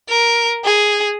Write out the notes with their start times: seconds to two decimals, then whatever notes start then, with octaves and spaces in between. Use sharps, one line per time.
0.09 A#4
0.65 G#4